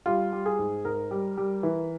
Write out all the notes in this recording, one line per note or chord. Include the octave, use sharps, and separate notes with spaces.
G3 F4
G3
G#4
G#2
G#2 A#4
G3
G3
E3